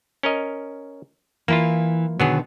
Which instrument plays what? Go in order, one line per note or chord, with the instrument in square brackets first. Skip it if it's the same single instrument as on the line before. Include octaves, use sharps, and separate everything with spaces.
[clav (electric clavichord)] C#4 A#4 D#5
[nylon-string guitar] E3 [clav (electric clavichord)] A#3 E4 F4
[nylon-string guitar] B2 D3 D#3 [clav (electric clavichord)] F#3 B3 G#4